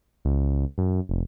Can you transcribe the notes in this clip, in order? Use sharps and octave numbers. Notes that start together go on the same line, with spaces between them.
C#2
F#2
F1